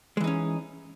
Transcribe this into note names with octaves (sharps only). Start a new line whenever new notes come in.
E3 G#3 C#4 D#4